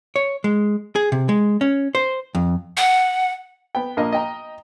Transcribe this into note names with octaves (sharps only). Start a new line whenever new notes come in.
C#5
G#3
G#4
C3
G#3
C#4
C5
F2
F#5
B3 G5
A#1 A#3 D#5
D#5 G5 A#5